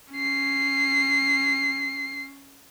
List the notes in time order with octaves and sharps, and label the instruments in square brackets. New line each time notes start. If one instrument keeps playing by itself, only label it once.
[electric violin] C#4 C7